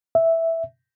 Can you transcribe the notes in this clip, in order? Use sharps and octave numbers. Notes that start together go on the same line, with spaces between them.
E5